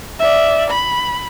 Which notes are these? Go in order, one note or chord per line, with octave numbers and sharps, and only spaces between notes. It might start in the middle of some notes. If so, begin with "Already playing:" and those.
D5 E5
B5